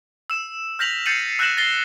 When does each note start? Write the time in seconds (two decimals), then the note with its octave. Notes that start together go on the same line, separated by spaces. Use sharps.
0.30 E6 E7
0.79 F6 G6 A#6 B6 F7 F#7
1.06 G6 A6 C7 C#7 D#7 F#7
1.39 E6 F#6 G6 A#6 E7 F#7
1.57 A6 A#6 C7 G7